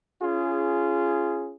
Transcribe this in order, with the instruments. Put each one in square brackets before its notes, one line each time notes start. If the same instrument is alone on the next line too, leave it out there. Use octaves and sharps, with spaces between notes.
[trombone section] C#4 F4 G#4